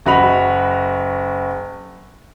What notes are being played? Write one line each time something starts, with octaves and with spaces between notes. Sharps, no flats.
F#1 F#4 D#5 B5 F7